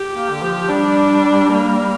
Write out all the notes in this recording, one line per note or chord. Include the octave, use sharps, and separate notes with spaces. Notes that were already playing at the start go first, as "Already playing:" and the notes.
Already playing: G4
A#3
D3
F3
G3 D4
A#3